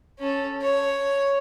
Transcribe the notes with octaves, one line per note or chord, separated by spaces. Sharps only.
C#4 A4
C#5